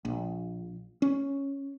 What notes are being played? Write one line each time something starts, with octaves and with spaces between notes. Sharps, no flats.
A#1
C#4